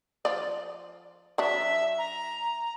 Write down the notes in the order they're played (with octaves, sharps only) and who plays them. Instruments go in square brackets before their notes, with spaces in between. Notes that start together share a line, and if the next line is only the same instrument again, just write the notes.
[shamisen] F3 D5
[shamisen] F#3 D4 [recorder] E5
[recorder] A#5